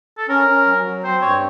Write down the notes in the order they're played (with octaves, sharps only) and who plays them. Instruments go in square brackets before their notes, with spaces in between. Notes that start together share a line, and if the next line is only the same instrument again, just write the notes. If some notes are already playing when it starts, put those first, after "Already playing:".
[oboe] A4
[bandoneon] C#4 [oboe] A#4
[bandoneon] C#4
F#3
F#3
[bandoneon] C4 [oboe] C5
[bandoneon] G2 [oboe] C#5